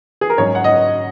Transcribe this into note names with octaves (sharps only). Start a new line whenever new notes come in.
G#4
A#4
G#2 F#3 C#4 C#5
F#5
D#5